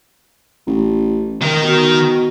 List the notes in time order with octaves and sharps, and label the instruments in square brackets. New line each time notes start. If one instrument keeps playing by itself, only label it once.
[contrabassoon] A1
[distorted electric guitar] D#3 A#4
[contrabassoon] B2